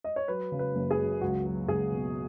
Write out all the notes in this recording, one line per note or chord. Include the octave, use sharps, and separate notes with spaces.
D#5
C#5
F#3 B4
C#3
B4
F#1
G#4
F#2
C#2 F#4
F#3
C#2 G#4
B2